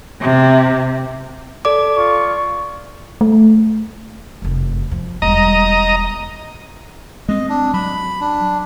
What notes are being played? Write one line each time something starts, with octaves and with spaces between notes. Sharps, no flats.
C3
A4 D5 D6
F4 C#6
A3
F1 F#2
F3
E1 G3 D#5 A#5
G#3 C4 D#5
D4
F#3 B5
D4